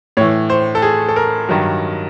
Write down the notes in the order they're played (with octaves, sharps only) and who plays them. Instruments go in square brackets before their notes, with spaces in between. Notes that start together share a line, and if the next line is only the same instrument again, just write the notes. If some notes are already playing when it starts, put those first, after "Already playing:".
[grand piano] A2 E3 C#5
C5
A4
G#4
A4
A#4
G2 D#3 F#3